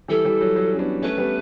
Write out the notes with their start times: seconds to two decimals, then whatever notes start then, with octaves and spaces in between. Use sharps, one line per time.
0.08 E3 G3 A4
0.25 E3 G3
0.41 F#3
0.56 F#3
0.73 C#4
0.79 B3 D4
1.02 A3 C#4 B4
1.18 G3 B3